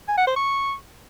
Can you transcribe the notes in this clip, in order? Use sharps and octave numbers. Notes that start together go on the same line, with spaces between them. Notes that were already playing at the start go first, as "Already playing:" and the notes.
G#5
F#5
C5
C#6